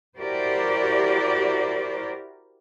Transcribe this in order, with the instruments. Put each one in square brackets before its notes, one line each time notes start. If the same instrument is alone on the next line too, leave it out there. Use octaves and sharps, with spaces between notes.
[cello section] E4 F#4 G4 A#4 C5 D5